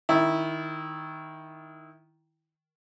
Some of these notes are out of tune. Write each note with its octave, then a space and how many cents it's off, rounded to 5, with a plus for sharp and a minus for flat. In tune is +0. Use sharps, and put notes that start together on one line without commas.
D#3 +10 E4 -5